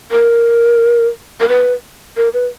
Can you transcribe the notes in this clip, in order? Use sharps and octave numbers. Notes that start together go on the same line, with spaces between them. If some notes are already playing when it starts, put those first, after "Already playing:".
A#4
A#4
B4
A#4
B4